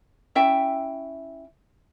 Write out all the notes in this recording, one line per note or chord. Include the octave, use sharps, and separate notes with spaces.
C#4 E4 E5 G5